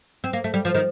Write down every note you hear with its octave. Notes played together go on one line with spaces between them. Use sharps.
C4
A#3
A3
G3
F3
D#3